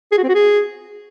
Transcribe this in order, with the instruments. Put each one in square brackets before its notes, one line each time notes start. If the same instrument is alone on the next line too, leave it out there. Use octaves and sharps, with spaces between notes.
[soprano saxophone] G#4
F#4
C4
F#4
G#4